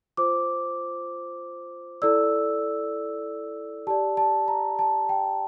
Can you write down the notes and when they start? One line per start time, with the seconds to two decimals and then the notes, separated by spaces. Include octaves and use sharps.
0.17 F4 C5 D6
2.02 E4 A4 D5 E6
3.87 G4 D5 A5
4.17 A5
4.48 A#5
4.79 A5
5.09 G5